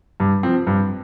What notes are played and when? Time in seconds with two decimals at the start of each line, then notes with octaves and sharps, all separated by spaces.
0.20 G2
0.43 F3 C4
0.67 G2